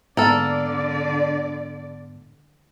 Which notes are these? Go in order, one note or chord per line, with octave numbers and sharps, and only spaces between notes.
G#2 D3 A#3 B3 A4 D5 F6